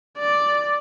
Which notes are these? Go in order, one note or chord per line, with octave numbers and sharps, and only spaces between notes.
D5